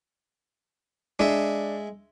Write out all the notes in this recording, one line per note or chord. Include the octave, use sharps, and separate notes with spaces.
G#3 D4 E5